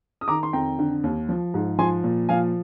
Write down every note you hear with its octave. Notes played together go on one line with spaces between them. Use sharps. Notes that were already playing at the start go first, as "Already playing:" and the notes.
D#6
D#3 A#5 D6
C6
F2 G5 A#5
D3
D#2
F3
G#2
F3 G#5 C6
A#2
F3 F5 G#5